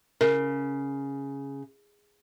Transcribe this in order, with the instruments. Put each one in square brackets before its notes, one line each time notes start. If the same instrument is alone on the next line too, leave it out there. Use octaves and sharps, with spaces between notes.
[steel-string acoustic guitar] C#3 [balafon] A#4